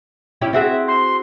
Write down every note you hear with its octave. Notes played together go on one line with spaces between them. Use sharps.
C#4 E4 G4
C4 F#4 G#4 E5
C6